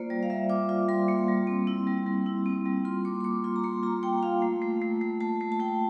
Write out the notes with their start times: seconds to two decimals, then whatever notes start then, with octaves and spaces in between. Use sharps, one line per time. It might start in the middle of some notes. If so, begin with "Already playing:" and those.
Already playing: A#3 F4 C5 D5
0.10 G3 D5
0.23 F5
0.30 G3 E5
0.49 F4 D6
0.69 F4
0.88 G3 C6
1.08 A#3
1.28 G3
1.47 C4
1.67 E4
1.87 G3
2.07 G3
2.26 E4
2.46 C4
2.65 G3
2.85 F4 C6
3.05 A#3 D6
3.20 C6
3.24 A#3 D6
3.44 F4 C6
3.56 A#5
3.64 A#3 C6
3.83 F4 A#5
4.03 A#3 G5
4.23 F4 F5
4.42 A3
4.62 A3
4.82 A3
5.01 A3
5.21 A3 A5
5.41 A3
5.52 A5
5.60 A3 G5